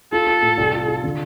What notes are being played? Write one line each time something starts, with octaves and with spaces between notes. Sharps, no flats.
F4 A4
F4
A2
C2
F4
F4
D3